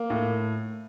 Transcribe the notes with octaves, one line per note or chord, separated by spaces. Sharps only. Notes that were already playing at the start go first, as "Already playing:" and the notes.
Already playing: A#3
A2